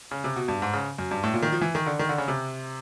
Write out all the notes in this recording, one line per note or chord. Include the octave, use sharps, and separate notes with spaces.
C#3
C3
B2
G2
G#2
C#3
F#2
G2
A2
A#2
D#3
F3
E3
D#3
D3
D#3
D3
C#3
C3